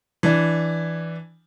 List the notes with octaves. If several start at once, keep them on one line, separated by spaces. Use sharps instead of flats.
E3 D4